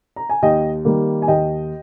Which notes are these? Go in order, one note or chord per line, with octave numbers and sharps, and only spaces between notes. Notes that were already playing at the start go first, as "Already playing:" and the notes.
A#5
G#5
D#2 D#5 G5
D#3 G3 A#3
G#5
D#2 D#5 G5